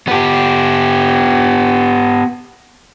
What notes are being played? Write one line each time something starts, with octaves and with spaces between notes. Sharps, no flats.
B3 G4